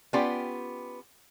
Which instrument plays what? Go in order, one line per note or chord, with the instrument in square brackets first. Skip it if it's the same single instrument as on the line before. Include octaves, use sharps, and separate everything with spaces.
[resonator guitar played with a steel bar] B3 C#4 F4 G4 D5 G5